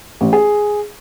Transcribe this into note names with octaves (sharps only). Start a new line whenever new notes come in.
A1
G#4